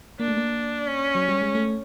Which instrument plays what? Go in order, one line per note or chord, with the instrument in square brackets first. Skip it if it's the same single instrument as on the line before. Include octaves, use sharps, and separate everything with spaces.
[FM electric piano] A#3 [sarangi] D4
[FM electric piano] A3
A#3
[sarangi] C#4
[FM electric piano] F#3
G3
G#3
A3